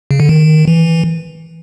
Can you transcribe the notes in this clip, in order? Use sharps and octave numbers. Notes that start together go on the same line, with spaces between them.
C#3
D3
D#3
E3